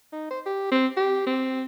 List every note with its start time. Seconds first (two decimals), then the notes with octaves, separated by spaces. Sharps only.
0.12 D#4
0.30 C5
0.46 G4
0.71 C4
0.97 G4
1.27 C4